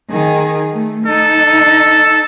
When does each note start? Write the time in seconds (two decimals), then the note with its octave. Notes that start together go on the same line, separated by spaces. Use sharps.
0.10 D#3 G#4
0.73 A3
1.06 D#4 A4